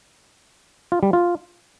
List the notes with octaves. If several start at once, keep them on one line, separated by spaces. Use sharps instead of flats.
F4
G3
F4